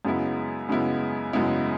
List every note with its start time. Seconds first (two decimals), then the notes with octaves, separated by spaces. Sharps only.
0.05 F#2 C#3 G#3 B3 E4
0.69 F#2 C#3 G#3 B3 E4
1.33 F#2 C#3 G#3 B3 E4